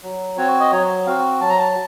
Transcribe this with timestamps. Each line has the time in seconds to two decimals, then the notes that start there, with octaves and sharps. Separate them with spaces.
0.03 F#3
0.37 C4 F#4 C#5
0.60 D#5
0.72 F#3 C#5
1.06 C4 F#4 F5
1.41 F#3 A5
1.49 A#5
1.59 A5